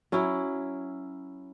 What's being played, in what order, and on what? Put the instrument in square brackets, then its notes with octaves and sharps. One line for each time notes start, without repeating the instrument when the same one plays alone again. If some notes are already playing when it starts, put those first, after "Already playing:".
[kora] F#3 C#4 E4